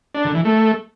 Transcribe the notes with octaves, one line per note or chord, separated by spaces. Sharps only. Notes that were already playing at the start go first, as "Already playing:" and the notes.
D4
D3
E3
A3